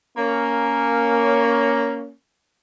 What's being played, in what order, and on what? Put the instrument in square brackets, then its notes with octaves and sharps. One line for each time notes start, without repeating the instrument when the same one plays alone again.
[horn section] A#3 C#4